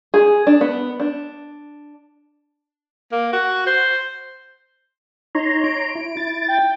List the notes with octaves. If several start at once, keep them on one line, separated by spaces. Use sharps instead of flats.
G#4
D4
B3
D4
A#3
F#4
C5
D#4 C#5 A#5 C6
D7
E4
E4 A6
G5